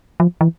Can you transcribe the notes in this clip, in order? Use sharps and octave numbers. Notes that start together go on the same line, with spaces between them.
F3
E3